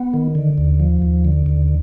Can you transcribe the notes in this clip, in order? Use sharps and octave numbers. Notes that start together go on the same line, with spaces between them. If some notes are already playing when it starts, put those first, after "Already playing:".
Already playing: B3
D#3
D3
D#2
F3
D#2
D3
D#2